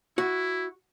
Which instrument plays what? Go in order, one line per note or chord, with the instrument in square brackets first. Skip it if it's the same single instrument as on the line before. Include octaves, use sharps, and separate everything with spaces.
[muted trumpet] E4 [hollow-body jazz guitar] F#4